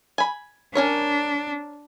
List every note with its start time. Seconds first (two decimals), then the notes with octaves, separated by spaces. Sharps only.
0.18 G#5 B5
0.75 C#4 D4 A#4 C#5